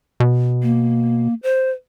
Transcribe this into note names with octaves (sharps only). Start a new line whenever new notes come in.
B2
A#3
C5